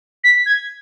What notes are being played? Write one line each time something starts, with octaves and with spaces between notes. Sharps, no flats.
B6
G#6